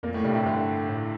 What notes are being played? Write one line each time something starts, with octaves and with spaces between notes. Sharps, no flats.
F2 A#2 A#3
A2 A3
G2 C3 G3
A#2
C3
A2
G2 D3
A2